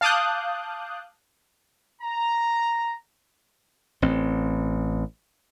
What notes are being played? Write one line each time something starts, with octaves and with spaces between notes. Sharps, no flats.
F5 A5 D6 D#6 F#6 G6
A#5
A1 C4